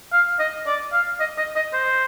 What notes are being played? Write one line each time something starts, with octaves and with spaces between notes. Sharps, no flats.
F5
D#5
D5
F5
D#5
D#5
D#5
C5